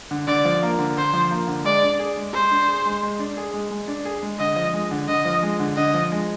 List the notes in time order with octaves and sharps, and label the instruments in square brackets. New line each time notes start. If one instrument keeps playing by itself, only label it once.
[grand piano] D3
[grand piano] D3 [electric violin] D5
[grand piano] F3
A#3
D3
[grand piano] D3 [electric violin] C5
[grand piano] F3
A#3
D3
[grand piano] G#3 [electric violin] D5
[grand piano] D4
G#4
G#3
[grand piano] G#3 [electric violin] C5
[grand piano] D4
G#4
G#3
G#3
D4
G#4
G#3
G#3
D4
G#4
G#3
[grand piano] D3 [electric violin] D#5
[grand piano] F3
G#3
D3
[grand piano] D3 [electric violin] D#5
[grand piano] F3
G#3
D3
[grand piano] D3 [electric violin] D#5
[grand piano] F3
G#3